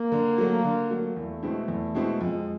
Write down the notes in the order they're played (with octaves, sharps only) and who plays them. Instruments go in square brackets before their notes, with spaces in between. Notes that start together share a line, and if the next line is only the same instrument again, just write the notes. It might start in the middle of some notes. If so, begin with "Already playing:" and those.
Already playing: [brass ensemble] A#3
[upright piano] D3
F#3 A3
D3
F#3 A3
[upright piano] E2 [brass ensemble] A3
[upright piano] B2 G#3 C4 E4
E2
B2 G#3 C4 E4
[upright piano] F2 [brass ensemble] G#3